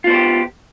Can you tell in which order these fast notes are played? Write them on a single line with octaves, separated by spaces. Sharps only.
F4 B3 C5 G4